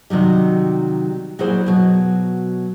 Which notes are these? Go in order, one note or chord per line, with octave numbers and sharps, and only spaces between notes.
C3 D#3 F#3 G3
A#2 F#3 E4 G#4 C5
B2 F#3